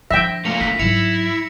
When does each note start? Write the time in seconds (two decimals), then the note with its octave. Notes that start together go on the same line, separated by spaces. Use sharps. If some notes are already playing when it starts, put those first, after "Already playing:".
0.11 F3 D4 E5 G5 A#6
0.45 A3 A#3 F4 C#7 F7
0.61 D4 B6
0.79 G#2 F#3 E4 C#7 F7